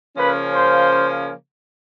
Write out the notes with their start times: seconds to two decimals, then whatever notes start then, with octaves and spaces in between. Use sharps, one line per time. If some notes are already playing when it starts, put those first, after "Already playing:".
0.16 C#3 F3 A#3 C#4 B4
0.53 C5